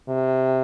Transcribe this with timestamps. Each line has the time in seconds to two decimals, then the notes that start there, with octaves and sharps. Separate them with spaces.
0.09 C3